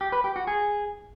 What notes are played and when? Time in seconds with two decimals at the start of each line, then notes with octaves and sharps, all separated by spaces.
0.01 G4
0.12 B4
0.24 G4
0.36 F#4
0.47 G#4